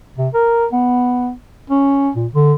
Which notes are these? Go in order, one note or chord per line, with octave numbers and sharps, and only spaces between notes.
C3
A#4
B3
C#4
A#2
D3